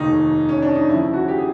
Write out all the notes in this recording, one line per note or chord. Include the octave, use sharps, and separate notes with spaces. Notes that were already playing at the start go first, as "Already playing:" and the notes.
Already playing: F1 D#2 D#3 D#4
C#4
D4
D#4
D#2 C#3 F3 E4
F#4
G4
G#4